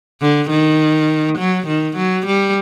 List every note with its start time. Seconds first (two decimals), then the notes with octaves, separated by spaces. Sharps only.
0.21 D3
0.50 D#3
1.38 F#3
1.67 D#3
1.97 F#3
2.26 G3